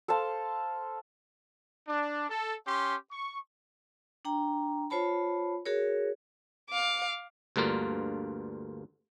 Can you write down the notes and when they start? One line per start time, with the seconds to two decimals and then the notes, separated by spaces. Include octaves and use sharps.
0.08 A4 C5 F5 A5
1.88 D4
2.30 A4
2.67 C#4 G4 C6
3.11 C#6
4.25 D4 G5 A#5
4.90 F4 C5 C#5 A5 B5
5.66 F#4 G#4 A#4 C#5
6.70 F5 D6
7.56 D2 G2 D3 A#3 F4